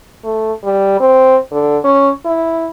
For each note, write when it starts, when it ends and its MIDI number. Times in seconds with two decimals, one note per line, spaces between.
0.24 0.52 57
0.64 0.98 55
1.00 1.36 60
1.52 1.78 50
1.84 2.10 61
2.25 2.69 64